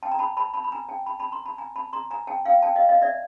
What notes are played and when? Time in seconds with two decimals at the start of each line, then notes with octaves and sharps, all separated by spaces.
0.03 G5 A5
0.12 A#5
0.19 A5 B5
0.37 A5 B5
0.54 A5 B5
0.64 B5
0.72 G#5 A#5
0.89 G5 A5
1.06 A5 B5
1.19 A5 B5
1.32 A#5 C6
1.45 A5 B5
1.58 G#5 A#5
1.76 A5 B5
1.93 A#5 C6
2.11 G#5 A#5
2.27 G5 A5
2.45 F5 G5
2.62 G5 A5
2.76 D#5 F5
2.89 D#5 F5
3.02 D5 E5